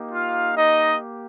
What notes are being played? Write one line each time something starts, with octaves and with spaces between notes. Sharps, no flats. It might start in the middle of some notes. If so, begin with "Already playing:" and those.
Already playing: A#3 D#4 G4
F4 F5
D#4 D#5